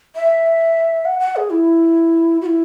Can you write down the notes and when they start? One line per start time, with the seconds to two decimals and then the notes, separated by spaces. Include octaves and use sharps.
0.15 E5
1.05 F#5
1.20 F#5
1.36 G#4
1.50 E4
2.41 F#4
2.46 E4